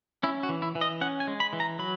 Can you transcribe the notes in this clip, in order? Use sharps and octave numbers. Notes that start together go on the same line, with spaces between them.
C#4 E4
F#4
E3
E4
E3
D#5
C#4 F#5
G#5
G#3
B5
E3
A#5
F#3 B5